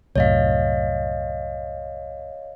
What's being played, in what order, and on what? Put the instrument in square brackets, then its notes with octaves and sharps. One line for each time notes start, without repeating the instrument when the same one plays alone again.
[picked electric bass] C2 F#2 A2 [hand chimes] C#5 D#5 F5